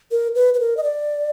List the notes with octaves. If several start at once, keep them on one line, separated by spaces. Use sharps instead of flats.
A#4
B4
B4
A#4
D#5
D5